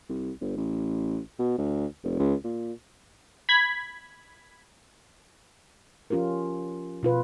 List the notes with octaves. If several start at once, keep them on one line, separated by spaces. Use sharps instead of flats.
C2
G1
A1
B2
D2
F1
C#2
A#2
B5 G#6 B6
F3 C#4 F4 G4 A#4
B2 F4 B4